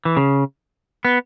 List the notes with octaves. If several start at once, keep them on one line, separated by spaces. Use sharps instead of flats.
E3
C#3
B3